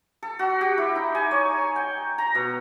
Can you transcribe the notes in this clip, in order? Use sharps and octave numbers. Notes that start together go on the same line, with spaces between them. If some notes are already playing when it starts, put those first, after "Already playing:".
A4
F#4
G4
E4
D#4
G#5
C#5
G5
A#5
B2